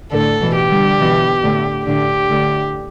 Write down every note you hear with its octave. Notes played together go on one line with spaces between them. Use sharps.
A2 D3 A4
B2 E3
G4
D3 G3
B2 E3
A2 D3
A2 D3 G4
A2 D3